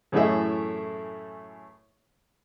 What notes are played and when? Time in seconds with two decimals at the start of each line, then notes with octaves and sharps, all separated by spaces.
0.12 F#2 A2 E3 A3 G#4 E5